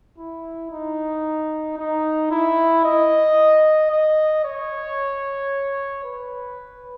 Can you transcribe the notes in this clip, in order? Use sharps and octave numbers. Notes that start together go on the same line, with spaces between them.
E4
D#4
D#4
E4
D#5
D#5
C#5
B4